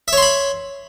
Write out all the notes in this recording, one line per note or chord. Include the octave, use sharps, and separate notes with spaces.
C#5 E5 B5 C6